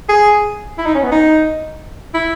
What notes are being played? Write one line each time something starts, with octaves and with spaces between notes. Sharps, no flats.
G#4
E4
D#4
C#4
B3
D#4
E4